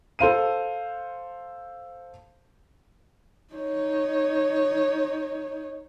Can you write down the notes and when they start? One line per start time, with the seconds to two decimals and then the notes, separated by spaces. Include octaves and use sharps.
0.19 A4 C5 F5 D#7
3.54 D#4 C#5